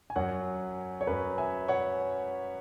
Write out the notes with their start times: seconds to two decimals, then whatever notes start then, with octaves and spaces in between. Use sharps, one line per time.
0.10 G#5
0.16 F#2 F#3 C#5 F#5
1.01 C#5
1.07 F#2 F#3 B4
1.38 E5 G#5
1.68 C#5 F#5